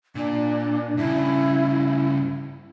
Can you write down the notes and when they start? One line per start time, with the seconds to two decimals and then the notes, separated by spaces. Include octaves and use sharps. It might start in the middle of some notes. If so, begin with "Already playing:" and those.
0.15 A#2 D4
0.97 G2 C#3 E4